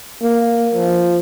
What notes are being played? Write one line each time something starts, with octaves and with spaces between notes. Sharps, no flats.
A#3
F3